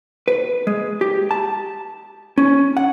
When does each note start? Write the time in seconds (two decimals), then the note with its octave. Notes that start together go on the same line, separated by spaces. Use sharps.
0.28 B4
0.67 G#3
1.01 G4
1.31 A5
2.38 C#4
2.77 F#5